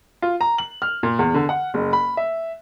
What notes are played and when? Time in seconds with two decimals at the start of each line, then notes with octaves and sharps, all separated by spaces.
0.22 F4
0.41 A#5
0.58 F#7
0.82 F6
1.03 A#2
1.19 E2
1.34 D3
1.49 F#5
1.74 F#1
1.93 B5
2.17 E5